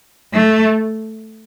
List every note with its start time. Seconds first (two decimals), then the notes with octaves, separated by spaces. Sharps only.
0.33 A3